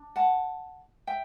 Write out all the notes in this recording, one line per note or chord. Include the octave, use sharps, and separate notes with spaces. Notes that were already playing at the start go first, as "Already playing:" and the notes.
Already playing: D4
F#5 A5
E5 G5